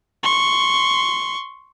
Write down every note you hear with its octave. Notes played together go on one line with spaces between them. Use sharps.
C6 C#6